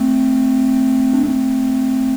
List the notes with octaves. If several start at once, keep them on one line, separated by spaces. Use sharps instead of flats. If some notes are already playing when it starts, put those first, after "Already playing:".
Already playing: A3 C4
D4
A3 C4